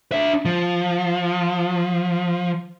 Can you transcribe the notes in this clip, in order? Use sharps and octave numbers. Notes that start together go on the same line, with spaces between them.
D4 E5
F3